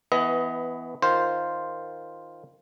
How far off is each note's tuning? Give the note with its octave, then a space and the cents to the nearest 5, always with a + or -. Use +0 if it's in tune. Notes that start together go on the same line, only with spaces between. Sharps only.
E3 +0 B3 +15 D#5 +25
D#3 +0 F4 +0 C5 +0